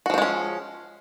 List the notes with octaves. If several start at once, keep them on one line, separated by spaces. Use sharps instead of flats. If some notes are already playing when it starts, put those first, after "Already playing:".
F3 G#3 C4 C#4 F#4